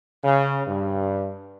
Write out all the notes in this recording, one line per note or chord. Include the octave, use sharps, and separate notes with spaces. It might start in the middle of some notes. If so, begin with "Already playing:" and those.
C#3
G2